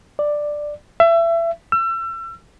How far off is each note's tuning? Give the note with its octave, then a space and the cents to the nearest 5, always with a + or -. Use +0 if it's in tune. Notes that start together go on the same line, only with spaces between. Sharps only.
D5 +10
E5 +30
E6 +35